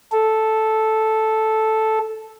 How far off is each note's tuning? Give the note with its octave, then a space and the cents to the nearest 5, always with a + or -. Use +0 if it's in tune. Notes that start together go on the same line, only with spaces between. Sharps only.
A4 -5